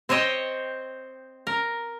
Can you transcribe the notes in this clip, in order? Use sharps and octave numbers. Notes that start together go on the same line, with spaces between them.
C4 C5 C#5 D#5 G5
A#4